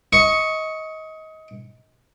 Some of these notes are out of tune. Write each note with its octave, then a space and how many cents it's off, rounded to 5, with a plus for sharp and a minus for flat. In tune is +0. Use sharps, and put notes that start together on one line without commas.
D#5 +25 C#6 +0